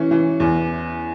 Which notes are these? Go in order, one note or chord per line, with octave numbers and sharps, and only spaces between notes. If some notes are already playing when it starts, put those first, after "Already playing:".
Already playing: E3 C#4
E3
E2